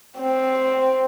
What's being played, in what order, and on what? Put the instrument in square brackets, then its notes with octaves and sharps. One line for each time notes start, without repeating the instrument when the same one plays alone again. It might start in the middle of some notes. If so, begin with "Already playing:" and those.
[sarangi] C4